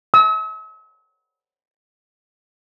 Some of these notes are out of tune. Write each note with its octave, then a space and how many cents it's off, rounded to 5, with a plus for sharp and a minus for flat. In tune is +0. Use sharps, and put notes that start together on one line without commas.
E6 -45